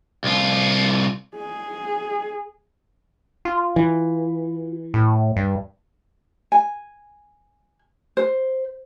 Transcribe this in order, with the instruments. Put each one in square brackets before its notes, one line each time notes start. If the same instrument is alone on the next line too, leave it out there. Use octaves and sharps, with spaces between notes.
[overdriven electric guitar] C2 F4
[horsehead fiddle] G#4
[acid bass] F4
[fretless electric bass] E3
[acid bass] A2
G2
[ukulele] G#5
C5